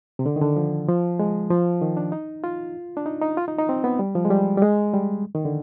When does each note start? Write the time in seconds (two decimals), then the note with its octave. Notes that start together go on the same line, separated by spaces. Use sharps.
0.19 C3
0.26 D3
0.36 D#3
0.41 D3
0.56 F3
0.88 F3
1.19 G#3
1.50 F3
1.82 D#3
1.97 D4
2.12 D#4
2.44 F4
2.97 D4
3.06 D#4
3.22 D#4
3.37 F4
3.48 D#4
3.59 D#4
3.69 C4
3.84 B3
3.99 G3
4.15 F3
4.25 G#3
4.30 G3
4.57 G3
4.62 G#3
4.94 G3
5.35 D#3
5.45 D3